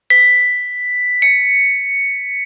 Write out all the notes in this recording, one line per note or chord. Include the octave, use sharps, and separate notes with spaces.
B6
C#7